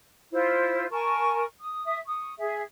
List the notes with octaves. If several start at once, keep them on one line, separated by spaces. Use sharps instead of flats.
E4 F4 C5
A#4 G#5 A5 C#6
D#6
E5 D#6
C#6 D#6
G#4 E5